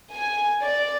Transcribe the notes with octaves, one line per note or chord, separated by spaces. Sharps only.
G#5
D5